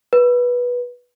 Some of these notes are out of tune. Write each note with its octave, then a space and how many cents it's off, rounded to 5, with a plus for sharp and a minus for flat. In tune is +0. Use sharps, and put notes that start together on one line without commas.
B4 -15